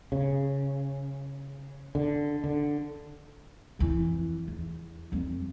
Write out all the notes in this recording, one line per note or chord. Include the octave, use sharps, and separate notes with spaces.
C#3
D3
D3
F2 E3
E2
F2 G3